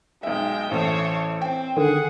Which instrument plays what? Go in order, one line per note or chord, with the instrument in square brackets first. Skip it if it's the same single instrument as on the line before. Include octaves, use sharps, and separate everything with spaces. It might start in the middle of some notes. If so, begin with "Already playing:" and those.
[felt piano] B1 E5 [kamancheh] G#3 G5
[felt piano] A1 A3 [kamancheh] C5 C#5
[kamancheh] C4 [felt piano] G5
[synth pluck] D3 D#3 [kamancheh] G#4 F#5